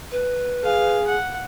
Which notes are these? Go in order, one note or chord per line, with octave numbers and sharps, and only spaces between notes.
B4
G#4 F5
F#5